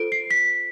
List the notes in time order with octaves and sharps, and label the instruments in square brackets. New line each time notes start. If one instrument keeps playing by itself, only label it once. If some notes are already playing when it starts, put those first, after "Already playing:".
Already playing: [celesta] F4 A4 C5 D7
C7
B6